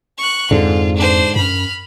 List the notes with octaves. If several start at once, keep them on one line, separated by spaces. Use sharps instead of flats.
C#6 F#6
F2 G#2 D3 F4
D4 C5
F#2 B5 F6